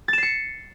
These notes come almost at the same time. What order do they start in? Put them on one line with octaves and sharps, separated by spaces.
A6 E7 C7 C#7